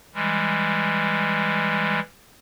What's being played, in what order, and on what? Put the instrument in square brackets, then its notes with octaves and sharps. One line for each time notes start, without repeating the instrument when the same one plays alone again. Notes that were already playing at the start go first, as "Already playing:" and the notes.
[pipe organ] E3 G3 G#3